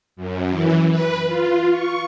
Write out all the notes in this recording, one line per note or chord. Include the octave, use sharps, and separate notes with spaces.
F#2
E3
B4
F4
C#6